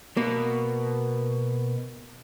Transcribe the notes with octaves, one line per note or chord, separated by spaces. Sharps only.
B2 A#3